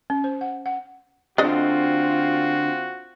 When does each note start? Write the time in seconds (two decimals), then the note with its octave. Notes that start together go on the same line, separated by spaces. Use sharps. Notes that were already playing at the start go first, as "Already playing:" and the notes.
0.10 C#4
0.24 C5
0.41 F#5
0.66 F#5
1.38 D2 D3 C4 D4 F4 F#4 D#5